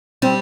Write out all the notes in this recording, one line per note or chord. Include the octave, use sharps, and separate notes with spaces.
G3 C4